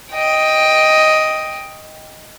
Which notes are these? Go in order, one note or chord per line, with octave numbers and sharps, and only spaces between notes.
D#5 G5